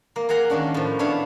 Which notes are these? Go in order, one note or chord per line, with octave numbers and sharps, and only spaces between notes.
A#3
A#3 G#4 F#5 A#5 C6
D#3 A#3 C#4 D4
A2 F3
B3 D4 E4 C#5 F5